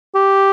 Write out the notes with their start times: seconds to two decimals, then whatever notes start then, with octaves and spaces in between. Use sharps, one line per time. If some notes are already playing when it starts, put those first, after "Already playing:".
0.15 G4